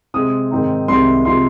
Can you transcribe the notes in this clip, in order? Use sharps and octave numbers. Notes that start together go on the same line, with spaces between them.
C3 G#3 C4 D#6
G#2 D#3 G#3 C4 D#4
C2 C3 D#3 G#3 C4 C6
C3 F3 G#3 C4 C6